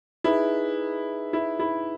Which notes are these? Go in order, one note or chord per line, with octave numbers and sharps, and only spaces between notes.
D#4 E4 G#4 B4
E4
E4